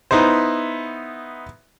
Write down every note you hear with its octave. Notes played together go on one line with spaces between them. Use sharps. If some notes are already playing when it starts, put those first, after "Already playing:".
B3 D#4 E4 C5